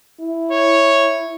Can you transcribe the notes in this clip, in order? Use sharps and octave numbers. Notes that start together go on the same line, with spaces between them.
E4
C#5